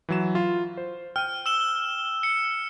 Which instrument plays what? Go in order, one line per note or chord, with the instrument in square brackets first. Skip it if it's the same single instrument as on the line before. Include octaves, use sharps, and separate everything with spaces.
[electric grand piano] E3 F#3 E7
F4
C5
[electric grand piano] G5 D#7 [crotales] F6
[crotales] E6 E7 G7
C#7